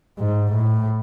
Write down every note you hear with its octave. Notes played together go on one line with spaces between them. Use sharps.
G#2
A2